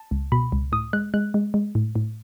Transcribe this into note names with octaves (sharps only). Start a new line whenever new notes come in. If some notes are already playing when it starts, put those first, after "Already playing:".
Already playing: A5
C#2
B2 B5
C#2
A2 D#6
G#3 F#6
G#3 F#6
G#3
G#3
A2
A2